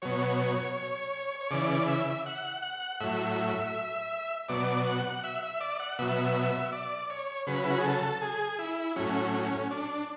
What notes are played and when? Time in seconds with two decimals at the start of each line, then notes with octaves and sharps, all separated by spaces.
0.02 B2 F#3 C#5
1.41 C#5
1.51 C#3 E3 D5
1.88 E5
2.26 F#5
2.62 F#5
3.00 A2 F#3 E5
4.49 B2 F#3 D5
4.87 F#5
5.24 E5
5.43 E5
5.61 D5
5.80 F#5
5.99 B2 F#3 E5
6.72 D5
7.10 C#5
7.47 C#3 F#3 B4
7.64 E4
7.71 F#4
7.78 G#4
7.85 A4
8.21 G#4
8.59 E4
8.96 A2 F#3 C#4
9.34 C#4
9.71 D4